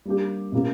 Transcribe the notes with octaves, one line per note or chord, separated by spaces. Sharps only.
G3 A#3 D4 G4
B2 A#3 C#4 E4 G4